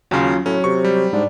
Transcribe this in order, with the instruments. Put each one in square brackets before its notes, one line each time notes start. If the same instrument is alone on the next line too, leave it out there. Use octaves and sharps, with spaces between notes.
[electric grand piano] D#2 C#3 [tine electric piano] F#3 C#4 F4
[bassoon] A2 [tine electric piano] F#3 [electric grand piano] C#4
[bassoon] C3 [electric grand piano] C#6
[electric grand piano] G3
[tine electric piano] G#2 [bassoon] D4